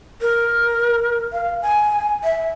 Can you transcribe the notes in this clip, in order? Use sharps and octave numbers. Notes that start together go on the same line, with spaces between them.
A#4
F5
G#5
E5